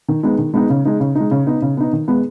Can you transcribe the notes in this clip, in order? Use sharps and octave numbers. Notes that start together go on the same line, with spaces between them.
D#3
G#3 B3 D#4
D#3
G#3 B3 D#4
C#3
G#3 D#4
C#3
G#3 D#4
C#3
B3 D#4
C#3
B3 D#4
D#3
G#3 B3